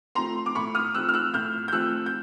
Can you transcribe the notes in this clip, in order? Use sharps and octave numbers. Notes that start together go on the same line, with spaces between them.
F3 A3 C4 A#5 C6
D6
A2 B5 C#6
D#6 F6
F3 A3 C4 E6 F#6
F6
E6 F#6
A2 F6 G6
G6
F3 A3 C4 E6 F#6
G6